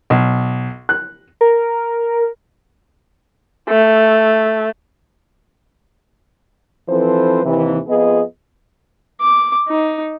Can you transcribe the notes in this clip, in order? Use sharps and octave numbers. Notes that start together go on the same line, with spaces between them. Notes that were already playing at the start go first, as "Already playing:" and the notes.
B1
F#6
A#4
A3
E3 F3 C4 A4 B4 C5
D#2 C3 E3
F2 B3 F4 G#4 D#5
D6
D#4